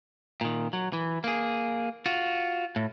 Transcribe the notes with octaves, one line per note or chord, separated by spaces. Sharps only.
A#2 D#3
F#3
E3
A#3 G#4
F4 F#4
A2